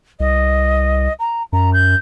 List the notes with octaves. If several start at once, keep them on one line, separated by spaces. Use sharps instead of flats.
C2 D#5
A#5
F#2 A#5
G6